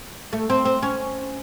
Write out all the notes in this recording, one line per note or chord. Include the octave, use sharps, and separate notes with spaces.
A3
C4
C4
C#4